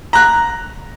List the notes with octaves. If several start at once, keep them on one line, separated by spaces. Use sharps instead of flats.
A#5 F#6